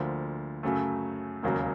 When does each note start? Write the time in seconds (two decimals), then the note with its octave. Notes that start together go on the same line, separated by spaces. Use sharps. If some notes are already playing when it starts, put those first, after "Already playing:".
Already playing: D2 D3 F3 A#3
0.63 F#2 C#3 F#3 A3
1.43 E1 D#2 C#3 F#3 A#3